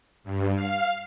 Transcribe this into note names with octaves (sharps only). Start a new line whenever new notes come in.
G2
F5